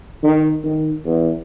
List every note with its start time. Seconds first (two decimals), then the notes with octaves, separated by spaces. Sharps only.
0.23 D#3
0.64 D#3
1.05 E2